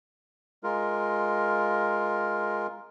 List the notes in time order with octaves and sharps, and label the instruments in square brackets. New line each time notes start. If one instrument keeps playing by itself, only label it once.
[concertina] G#3 F4 A#4